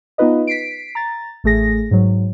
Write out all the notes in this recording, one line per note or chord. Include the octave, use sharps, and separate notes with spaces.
B3 D#4 F4 B4 D#5
B6 C7 D7
A#5 A6
A1 A3 G#4 A#6
G#2 F#3